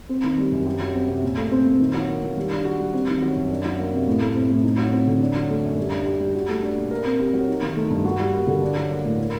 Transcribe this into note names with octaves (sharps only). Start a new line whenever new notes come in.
C4
D#3
G3
F#2
G4
F#3
C4
C3
A#2
A3
C4
A#2
D#3
F#3
A#3
D#3
G3
D4
F#4
G3
C4
D#3
F#3
F#2
D4
F#3
A#3
C3
A2
A3
C4
A2
D#4
F#3
C4
D3
D4
F#3
A3
F#2
G3
D4
G4
G3
F#4
A3
D4
A#2
A#4
C4
G4
F#3
D#4
D#3
A3
G2
F#4
G3
A#3
D3
D4
F#3
A#3
A2
A#4